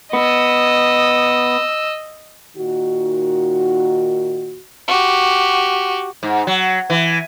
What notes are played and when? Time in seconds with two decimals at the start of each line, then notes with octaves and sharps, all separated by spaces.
0.13 B3 D#5 E6
2.57 A#2 D#3 D#4 F#4
4.88 F#4 G4
6.23 G#2
6.47 F#3
6.90 E3